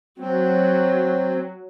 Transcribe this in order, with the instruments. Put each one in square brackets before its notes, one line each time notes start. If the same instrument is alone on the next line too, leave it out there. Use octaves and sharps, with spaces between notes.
[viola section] F#3 [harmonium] C4